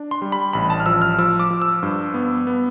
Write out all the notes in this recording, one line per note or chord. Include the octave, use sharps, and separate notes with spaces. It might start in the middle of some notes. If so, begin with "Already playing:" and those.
Already playing: D4
C6
G3
B5
A1 B5
A5
F6
F3 E6
F6
F3 E6
D6
F3
E6
G2
B3
B3